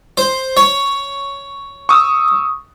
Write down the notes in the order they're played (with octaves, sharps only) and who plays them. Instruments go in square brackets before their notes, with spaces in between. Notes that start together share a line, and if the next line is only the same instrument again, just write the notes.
[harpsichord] C5
C#5
[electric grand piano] C#6 D#6 E6